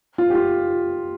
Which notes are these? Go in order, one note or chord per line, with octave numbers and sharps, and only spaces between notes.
F4
G4
F4